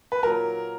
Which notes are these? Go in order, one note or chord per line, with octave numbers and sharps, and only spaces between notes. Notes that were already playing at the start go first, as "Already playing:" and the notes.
B4
A#2 F#3 A#4